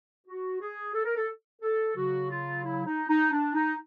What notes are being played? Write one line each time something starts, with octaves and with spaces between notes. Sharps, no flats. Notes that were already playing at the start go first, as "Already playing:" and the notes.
F#4
G#4
A4
A#4
A4
A4
C#3 F#3 F#4
F4
E4
D#4
D#4
D4
D#4